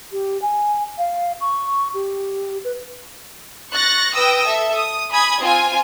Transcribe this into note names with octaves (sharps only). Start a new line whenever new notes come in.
G4
G#5
F5
C#6
G4
B4
C#6 F#6 A6 A#6
B4 G5 D#6 E6 A#6
A4 E5
D#6
G#5 B5 D#6 G#6
C4 F4 G#5